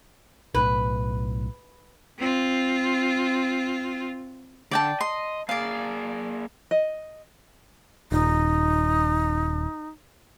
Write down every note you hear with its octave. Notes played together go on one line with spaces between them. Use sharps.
B1 A2 B4
C4 F4
D3 D5 G5 A5
D#5 C6
A#3 G#4 D5 F5
D#5
D#1 D#4